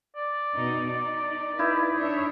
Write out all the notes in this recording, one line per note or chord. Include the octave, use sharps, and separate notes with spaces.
D5
B2 D#4
D#4
D#4 E4 B4
D4 C#5 E5